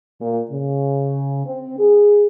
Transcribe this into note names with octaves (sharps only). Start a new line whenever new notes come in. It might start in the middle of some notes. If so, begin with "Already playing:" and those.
A#2
C#3
C4
G#4